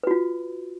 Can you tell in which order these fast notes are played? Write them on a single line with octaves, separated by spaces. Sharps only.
B4 F#4 F4